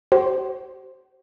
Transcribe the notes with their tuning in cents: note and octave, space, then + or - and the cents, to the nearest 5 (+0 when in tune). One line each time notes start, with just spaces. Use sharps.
F#4 +45 C5 +0